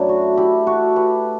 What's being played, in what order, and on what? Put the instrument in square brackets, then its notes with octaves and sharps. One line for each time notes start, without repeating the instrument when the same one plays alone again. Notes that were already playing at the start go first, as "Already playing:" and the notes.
Already playing: [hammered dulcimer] F#2 F#3 A3 D4 E4
F#4
E4 G4
F#4 A4
G4 B4